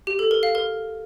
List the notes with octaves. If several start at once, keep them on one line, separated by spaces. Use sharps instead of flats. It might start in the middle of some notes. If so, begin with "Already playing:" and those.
G4
A4
A#4
F5
A#4